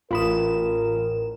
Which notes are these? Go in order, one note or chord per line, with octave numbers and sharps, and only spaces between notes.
A1 F4 A#4 B5 D#6 E7